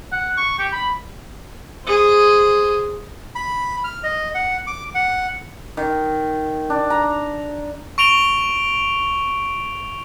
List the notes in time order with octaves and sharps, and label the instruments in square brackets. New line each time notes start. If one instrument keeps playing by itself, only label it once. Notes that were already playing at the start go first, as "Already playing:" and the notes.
[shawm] F#5
C#6
G4
B5
[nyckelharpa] G#4 C5
[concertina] B5
F6
D#5
F#5
D6
F#5
[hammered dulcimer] D#3
D4
A#5
[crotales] C#6 D7 F7 G7